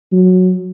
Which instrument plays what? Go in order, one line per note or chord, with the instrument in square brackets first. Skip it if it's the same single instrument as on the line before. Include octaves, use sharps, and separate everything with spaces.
[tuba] F#3